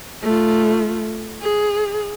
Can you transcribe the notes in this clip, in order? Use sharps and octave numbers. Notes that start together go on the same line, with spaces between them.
A3 F4
G#4